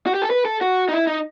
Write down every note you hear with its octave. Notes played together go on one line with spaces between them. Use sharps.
F#4
G4
A4
B4
A4
F#4
D#4
E4
D#4